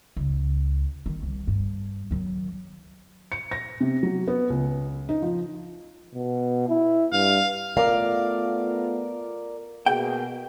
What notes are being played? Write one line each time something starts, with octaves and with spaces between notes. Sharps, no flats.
C#2
D#3
C2
G2
D#3 F#3
C#7
A#6
C3
F#3
B3
C#2
D#4
F3
B2
E4
G2 F5
A3 B3 F4 A#4 D5 F5
B2 A#3 G#4 G5